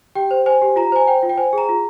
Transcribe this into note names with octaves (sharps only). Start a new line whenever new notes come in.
G4 G5
C5
C5 G#5
G4
F4 A#5
C5 G#5
C5 G5
F4
G5
C5 G#5
G#4 A#5
F4